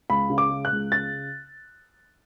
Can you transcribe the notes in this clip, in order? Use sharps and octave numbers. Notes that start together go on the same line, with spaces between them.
C#2 B5
C#3
D6
G#3
F#6
C#2
C#3 A6